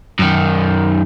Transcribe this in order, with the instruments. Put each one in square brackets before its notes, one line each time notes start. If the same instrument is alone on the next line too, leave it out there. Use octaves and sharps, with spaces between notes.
[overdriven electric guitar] F#2 D#3